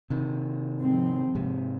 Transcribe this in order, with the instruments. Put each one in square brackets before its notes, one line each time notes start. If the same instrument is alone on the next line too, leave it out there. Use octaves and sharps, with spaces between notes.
[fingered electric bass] C3 D#3
[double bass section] G#2 F3 G#3 C4
[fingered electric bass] G#2 C3